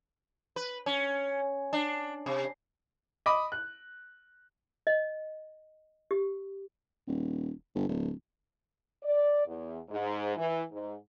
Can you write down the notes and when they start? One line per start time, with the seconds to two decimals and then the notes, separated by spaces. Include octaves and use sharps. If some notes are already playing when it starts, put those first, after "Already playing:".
0.56 B4
0.86 C#4
1.73 D4
2.26 C3
3.26 D#5 B5 D6 D#6
3.52 F#6
4.87 D#5
6.11 G4
7.07 D#1
7.75 G1
7.89 D1
9.03 D5
9.46 E2
9.89 G#2
10.36 E3
10.72 G#2